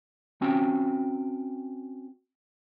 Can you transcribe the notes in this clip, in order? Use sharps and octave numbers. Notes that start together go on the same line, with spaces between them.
C4 C#4 F#4 G5